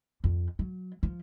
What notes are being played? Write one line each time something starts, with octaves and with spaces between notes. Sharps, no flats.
F2
F#3
F3